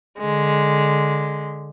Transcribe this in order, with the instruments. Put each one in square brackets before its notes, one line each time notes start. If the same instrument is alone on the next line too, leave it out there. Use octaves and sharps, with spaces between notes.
[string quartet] D3 G#3